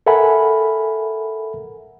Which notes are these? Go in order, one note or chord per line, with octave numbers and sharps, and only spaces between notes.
A4 A#4 E5 F#5 G#5 B5